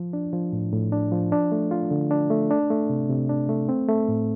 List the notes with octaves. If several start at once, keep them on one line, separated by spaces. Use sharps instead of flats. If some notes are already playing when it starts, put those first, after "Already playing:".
Already playing: F3
D4
F3
A2
A2
D4
F3
D4
A3
F4
D3
D4
A3
D4
A3
C3
C3
D4
A3
C4
A3
A2